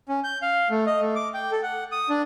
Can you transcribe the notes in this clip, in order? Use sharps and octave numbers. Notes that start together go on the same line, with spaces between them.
C#4
G6
F5
A3
D#5
A3
D6
G5
A4
F#5
D#6
D4